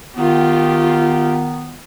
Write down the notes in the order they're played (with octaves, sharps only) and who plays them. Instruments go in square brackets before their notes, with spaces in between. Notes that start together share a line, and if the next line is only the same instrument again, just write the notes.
[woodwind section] D#3 B3 [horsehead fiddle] F4 G4